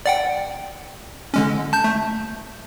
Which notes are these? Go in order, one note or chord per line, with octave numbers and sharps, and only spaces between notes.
D5 F#5 G5
D3 G#3 C#4
A5 G6
A3